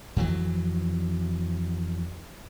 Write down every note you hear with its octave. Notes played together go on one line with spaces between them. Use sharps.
F2 E3 F#3